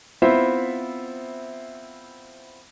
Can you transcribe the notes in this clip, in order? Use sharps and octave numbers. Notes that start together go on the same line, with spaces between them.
B3 C4 E4 F4 C5 E5